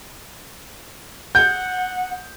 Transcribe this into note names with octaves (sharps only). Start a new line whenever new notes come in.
F#5 G6